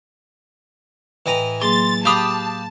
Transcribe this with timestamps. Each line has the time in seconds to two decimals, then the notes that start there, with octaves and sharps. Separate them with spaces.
1.26 A2 E3 B4 D#5 G5 A#5
1.62 F#3 A#3 G#4 C6 A6
2.05 G4 F5 A5 B5 D#6 F#6